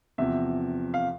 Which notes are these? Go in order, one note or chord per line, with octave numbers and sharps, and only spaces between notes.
E2 C3 F3 E5
F5